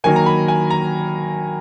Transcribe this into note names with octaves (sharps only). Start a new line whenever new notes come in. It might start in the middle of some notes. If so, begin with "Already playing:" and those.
D#3 F#3 A#3 G#5
A#5
B5
G#5
A#5